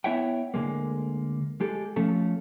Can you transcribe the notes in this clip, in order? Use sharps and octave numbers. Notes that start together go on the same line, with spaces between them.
B3 E4 C#5 E5 F#5 G5
D2 D3 G#3 A#3
G#3 G4 A4
F3 A3 C#4 A4